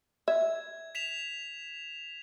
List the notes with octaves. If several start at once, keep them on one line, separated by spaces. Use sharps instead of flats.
E5 G#6
B6 E7 F7